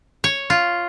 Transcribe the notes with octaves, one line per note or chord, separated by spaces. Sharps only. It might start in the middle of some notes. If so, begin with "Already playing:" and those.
C#5
F4